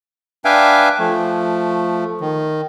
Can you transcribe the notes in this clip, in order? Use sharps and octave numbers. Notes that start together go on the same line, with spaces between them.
D4 B4 E5 F5 G5 G#5
F3 A3
D#3